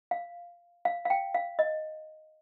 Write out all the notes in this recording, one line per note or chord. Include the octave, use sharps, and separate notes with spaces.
F5
F5
F5
G5
F5
D#5